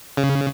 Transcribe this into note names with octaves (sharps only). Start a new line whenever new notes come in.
C#3